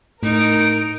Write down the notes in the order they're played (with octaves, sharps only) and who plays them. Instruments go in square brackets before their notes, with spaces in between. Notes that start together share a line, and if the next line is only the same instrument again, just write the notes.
[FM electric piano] A2 [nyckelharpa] D#4 [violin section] A#4 D7